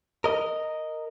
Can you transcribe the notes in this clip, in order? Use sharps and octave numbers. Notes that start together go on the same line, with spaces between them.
A#4 D#5